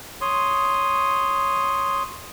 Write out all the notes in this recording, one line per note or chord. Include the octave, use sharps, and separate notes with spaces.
C#5 C6 D#6